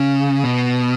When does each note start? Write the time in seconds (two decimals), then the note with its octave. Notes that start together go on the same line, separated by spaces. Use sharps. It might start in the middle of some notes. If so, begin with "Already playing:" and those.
Already playing: C#3
0.43 B2